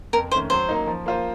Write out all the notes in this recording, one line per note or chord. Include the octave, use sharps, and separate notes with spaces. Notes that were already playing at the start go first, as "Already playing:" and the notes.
F2 A#4
D#3 A3 C#4 C5
F#3 C5
A#3 D#4
F3
A#3 F4 C5